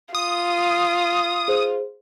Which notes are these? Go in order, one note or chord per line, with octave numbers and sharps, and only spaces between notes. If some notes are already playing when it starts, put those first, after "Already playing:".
F4 D#6
G#4 C5